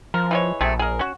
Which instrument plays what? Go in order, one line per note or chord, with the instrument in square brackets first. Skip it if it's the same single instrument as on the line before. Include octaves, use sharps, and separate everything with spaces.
[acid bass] F3 [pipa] A#4
[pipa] E3 G#3 C#5
[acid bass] A#1 [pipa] C3 A3 G#4
[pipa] G#4 A#4
C#4 F#4